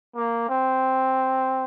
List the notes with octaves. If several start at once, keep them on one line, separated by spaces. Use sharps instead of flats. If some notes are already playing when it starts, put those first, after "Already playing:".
A#3
C4